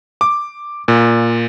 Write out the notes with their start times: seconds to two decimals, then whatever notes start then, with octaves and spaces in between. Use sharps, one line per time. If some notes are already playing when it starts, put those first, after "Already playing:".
0.21 D6
0.88 A#2